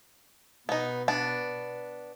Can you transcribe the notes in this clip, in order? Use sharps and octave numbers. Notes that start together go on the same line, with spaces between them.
B2 B3 D#4
B3 D4